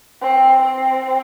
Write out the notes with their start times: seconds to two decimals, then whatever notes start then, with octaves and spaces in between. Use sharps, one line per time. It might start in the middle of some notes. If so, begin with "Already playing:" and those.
0.22 C4
0.62 C4